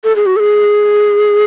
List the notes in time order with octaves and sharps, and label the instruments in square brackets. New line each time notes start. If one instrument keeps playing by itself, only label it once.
[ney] A4
G#4
F#4
A4
G#4